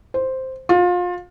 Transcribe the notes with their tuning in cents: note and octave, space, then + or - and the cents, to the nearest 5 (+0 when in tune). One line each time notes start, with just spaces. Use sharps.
C5 +0
F4 +30